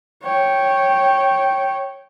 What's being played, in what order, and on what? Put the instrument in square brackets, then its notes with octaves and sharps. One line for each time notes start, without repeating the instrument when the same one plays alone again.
[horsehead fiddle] C#5 G5